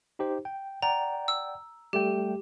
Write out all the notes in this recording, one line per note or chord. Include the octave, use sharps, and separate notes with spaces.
D#4 G4 C5
G5
D5 F#5 G5 A#5
E6
G3 A3 G4 G5